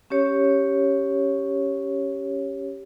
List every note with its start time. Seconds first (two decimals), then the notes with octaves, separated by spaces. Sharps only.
0.10 C#4 G4 C#5